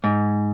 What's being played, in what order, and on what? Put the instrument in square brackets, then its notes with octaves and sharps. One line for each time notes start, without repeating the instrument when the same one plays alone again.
[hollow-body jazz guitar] G#2